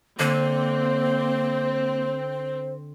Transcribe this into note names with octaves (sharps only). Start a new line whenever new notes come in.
D3 A#3 C4 C5